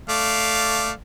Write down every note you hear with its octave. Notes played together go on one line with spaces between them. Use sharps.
A3 D5 F5